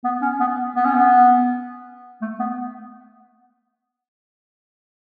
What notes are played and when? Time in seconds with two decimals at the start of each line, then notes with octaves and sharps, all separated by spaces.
0.04 B3
0.22 C#4
0.40 B3
0.76 B3
0.85 C#4
0.95 B3
2.21 A3
2.39 B3